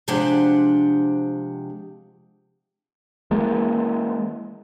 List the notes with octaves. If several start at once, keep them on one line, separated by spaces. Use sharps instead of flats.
C3 F3 G#3 D4 G4 F#5
E3 G#3 A#3